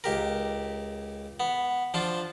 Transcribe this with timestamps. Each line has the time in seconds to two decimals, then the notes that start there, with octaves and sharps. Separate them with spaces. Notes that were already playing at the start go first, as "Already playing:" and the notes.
0.04 C#2 G4 A#4
1.40 B3
1.94 F3 D4 F4